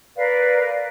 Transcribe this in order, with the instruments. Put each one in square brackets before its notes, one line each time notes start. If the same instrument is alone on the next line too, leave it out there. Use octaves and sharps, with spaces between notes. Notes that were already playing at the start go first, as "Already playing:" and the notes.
[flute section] A#4 B4 D5 F5